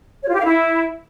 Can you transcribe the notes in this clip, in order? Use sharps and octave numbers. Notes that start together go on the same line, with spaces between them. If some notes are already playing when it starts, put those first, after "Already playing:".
C#5
F4
G4
F5
E4